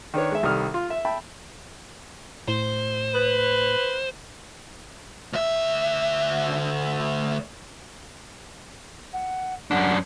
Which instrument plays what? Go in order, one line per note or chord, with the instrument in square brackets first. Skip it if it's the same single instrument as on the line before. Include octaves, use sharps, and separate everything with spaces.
[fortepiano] D#3 D4 B4 C#5
G#3 E5
C2 D#3 G3 A4 D#6 F6
F4
E5
E5 G5 A5 B5
[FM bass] A2 [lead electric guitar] C5
[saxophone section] B4
[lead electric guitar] D2 E5
[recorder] F#5
[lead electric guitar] F#2 D4 [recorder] F#5